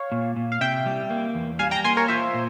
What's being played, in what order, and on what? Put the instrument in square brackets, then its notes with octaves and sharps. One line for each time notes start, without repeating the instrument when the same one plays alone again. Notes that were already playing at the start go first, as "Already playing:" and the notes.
Already playing: [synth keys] C#5 F5
[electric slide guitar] A#2
A#2
[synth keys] F5
[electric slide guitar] C3 [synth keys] E5 G5
[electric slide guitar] G3
A#3
E2
[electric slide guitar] G3 [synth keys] F5 G#5
[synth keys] G5 A#5
[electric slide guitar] A#3 [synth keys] G#5 C6
[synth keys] A#4 C#5
[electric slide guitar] F4 [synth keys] C5 E5
[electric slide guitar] A#2